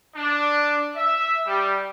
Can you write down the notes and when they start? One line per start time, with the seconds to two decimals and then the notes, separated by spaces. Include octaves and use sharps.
0.15 D4
0.96 E5
1.47 G3